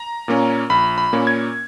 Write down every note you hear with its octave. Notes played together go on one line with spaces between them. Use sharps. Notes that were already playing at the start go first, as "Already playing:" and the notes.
Already playing: A#5
A#2 A#3 C#4
A#1 B5
B5
A#2 A#3 C#4
G#6